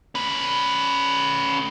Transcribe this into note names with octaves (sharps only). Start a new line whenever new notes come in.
C#4 B4